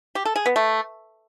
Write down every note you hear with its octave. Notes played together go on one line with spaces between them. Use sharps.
G4
A4
G#4
B3
A3